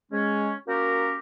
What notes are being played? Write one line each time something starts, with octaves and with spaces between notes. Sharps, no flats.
G#3 C#4
A#3 C#4 F#4 G4 A#4